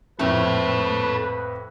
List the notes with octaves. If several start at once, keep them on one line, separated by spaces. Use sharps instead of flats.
F2 A2 A3 C4 A4 B4 C#5